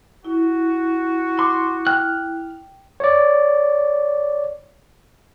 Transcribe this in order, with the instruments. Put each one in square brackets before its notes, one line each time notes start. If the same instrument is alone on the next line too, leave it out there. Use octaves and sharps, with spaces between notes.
[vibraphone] E4 [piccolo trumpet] F#4
[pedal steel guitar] C6 [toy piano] D6
[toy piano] G5 [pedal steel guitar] F6 F#6
[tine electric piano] C#5 D5